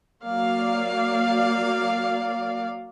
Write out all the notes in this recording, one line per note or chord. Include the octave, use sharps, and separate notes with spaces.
F#3 A#3 D5 F5